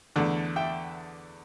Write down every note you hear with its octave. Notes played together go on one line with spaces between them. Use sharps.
E2 D3 A3 D4
E5 G5